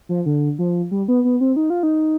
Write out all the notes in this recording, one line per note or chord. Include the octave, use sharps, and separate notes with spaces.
F3
D3
F3
G3
B3
B3
C4
D#4
F4
D#4